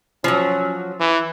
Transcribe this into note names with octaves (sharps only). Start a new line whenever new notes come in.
F3 F#3 C#4
E3